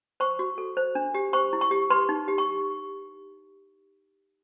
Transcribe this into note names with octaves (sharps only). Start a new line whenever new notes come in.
C5 C#6
F#4
A4
C5
D4
G4
C5 C#6
E4
C#6
G4
B4 C6
D#4
G4
C#6